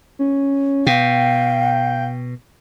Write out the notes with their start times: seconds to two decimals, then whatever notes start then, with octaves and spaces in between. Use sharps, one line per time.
0.19 C#4
0.87 B2 F5 G5